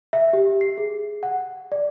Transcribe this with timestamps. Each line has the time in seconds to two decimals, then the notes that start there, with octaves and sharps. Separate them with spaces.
0.13 E5
0.33 G4
0.61 C7
0.78 G#4
1.23 F#5
1.72 D5